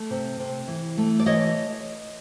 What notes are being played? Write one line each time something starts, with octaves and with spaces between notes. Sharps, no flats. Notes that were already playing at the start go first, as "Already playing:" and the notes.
Already playing: A3
C3
C3
E3
A3
D5
E3 C#5 D#5